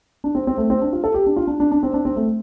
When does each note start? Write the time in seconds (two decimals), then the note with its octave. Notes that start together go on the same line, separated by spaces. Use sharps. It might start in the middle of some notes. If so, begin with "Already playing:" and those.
0.24 D4
0.35 C4
0.47 C4
0.58 A3
0.70 C4
0.81 D4
0.93 F4
1.04 A4
1.14 G4
1.26 D4
1.36 F4
1.47 D4
1.60 D4
1.71 D4
1.83 C4
1.94 D4
2.05 C4
2.16 A3